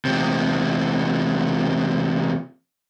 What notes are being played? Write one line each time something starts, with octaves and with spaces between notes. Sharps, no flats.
E2 C3